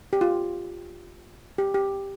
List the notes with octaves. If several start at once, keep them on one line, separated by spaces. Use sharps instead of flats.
G4
F4
G4
G4